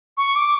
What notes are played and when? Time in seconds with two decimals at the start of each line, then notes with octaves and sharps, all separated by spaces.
0.17 C#6
0.35 D6